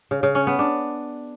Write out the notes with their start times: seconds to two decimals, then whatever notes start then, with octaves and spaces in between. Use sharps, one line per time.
0.11 C#3
0.23 C#3
0.35 C#4
0.47 B3
0.59 D4